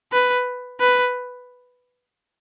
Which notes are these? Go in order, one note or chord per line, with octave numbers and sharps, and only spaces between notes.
B4
B4